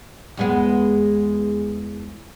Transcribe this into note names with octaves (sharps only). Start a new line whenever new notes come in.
E2 G#3 B3